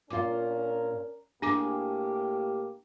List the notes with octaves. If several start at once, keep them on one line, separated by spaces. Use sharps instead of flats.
A#2 C#4 D4 F4 A#4 D6
A2 A#3 D4 G4 G#4 G#5 D6